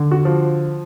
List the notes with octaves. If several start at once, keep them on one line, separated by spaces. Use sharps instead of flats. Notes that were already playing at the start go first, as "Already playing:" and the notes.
Already playing: D3
F#4
F3